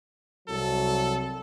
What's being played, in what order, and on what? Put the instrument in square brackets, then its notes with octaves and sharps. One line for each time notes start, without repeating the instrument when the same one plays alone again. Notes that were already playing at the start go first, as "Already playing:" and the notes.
[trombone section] C2 F#3 [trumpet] A4